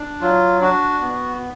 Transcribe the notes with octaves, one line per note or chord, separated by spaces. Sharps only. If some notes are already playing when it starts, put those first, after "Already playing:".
Already playing: D4
F#3 F4
D4 F#4
B3